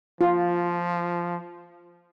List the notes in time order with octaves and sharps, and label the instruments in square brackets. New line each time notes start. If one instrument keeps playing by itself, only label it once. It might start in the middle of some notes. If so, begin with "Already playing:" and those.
[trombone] F3 [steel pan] F4